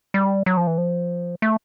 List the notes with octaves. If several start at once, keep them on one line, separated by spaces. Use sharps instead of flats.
G3
F#3
F3
E3
F3
A3